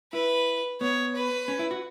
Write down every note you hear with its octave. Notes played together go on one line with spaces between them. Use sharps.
E4 B4
B3 C#5
B4
C#4
E4
F#4